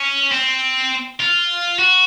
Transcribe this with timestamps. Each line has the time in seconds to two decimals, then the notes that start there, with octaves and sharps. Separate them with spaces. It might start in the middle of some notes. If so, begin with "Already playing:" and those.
Already playing: C#4
0.32 C4
1.20 F4
1.79 F#4